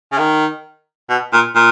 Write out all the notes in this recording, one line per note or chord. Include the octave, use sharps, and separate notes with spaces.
C#3
D#3
B2
A#2
A#2